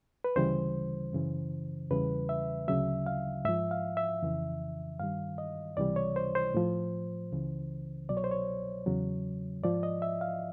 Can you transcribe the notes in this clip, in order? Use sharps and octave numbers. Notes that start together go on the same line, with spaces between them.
B4
D2 C#3 E3 G3 C5
F#2 C#3 E3
E2 C#3 E3 G3 B4
E5
D2 C#3 F#3 E5
F5
G#2 F3 E5
F5
E5
F2 C#3 E3
G2 D#3 G3 F5
D#5
C#2 C3 E3 G3 D5
C#5
C5
C5
A2 F3
C#2 C#3 E3
C2 B2 F#3 D5
C#5
C5
C#5
E2 C#3 F#3
G#2 F3 D5
D#5
E5
F5